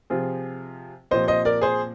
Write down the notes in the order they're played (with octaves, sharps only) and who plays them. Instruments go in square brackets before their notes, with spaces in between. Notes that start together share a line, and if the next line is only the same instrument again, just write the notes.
[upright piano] C3 F3 C4 F4 G#4
[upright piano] A#2 F3 C4 G4 [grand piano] C5 D#5
[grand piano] C5 D#5
A#4 D5
G#4 C5